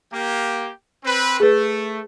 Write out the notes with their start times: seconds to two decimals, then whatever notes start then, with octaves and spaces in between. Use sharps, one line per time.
0.13 A#3 G4
1.04 C4 B4
1.40 A3 G#4 B4